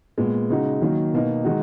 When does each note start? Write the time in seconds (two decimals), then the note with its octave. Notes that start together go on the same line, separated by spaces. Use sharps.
0.18 A#2 G#3 B3
0.50 C#3 G#3 D#4 F#4
0.82 D#3 F#3 A#3 D#4
1.14 B2 A#3 D#4
1.44 D#3 G#3 D#4 F#4